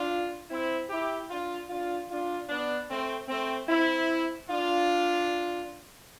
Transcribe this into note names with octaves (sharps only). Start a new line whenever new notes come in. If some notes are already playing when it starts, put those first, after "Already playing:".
Already playing: D4 F4
C4 E4
E4 G4
D4 F4
D4 F4
D4 F4
B3 D4
A3 C4
A3 C4
C4 E4
D4 F4